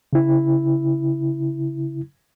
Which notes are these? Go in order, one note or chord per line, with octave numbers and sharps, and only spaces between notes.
C#3 E4